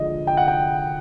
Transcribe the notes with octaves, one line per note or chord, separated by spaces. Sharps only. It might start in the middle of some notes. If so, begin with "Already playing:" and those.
Already playing: D3 F3 G#3 D#5
G5
F#5
G5